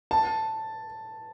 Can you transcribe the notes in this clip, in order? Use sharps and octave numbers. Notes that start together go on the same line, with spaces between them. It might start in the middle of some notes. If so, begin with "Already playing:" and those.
A5